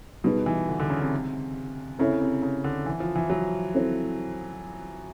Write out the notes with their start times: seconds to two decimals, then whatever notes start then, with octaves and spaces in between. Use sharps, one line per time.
0.24 B2 G3 B3 D#4 G#4 B4
0.46 E3
0.69 D3
0.80 D3
0.90 C#3
1.01 C3
1.98 C#3 C4 E4 A4 C#5 E5
2.21 C3
2.43 C#3
2.64 D3
2.86 E3
3.00 F3
3.16 E3
3.30 F#3
3.74 C4 E4 A4 C5